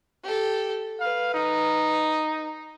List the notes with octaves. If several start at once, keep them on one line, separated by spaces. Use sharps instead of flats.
G4 A4
B4 F5
D#4